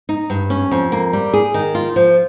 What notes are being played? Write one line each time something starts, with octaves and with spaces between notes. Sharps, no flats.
D#4
G2
C#4
F2
A#3
G3
G#4
D#3
F4
F3